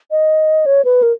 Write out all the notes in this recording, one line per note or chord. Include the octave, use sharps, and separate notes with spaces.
D#5
C#5
B4
A#4